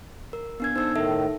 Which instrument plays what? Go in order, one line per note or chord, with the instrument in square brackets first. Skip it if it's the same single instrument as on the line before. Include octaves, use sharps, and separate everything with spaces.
[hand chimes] A#4
B3 D4 G#6
[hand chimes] D#4 E6 [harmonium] A4 C5
[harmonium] A2 D#3 [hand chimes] D#4 A4 E5